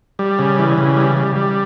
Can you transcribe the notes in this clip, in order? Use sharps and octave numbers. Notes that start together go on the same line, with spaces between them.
G3
C#3
E3
C#3
G3
G3
G3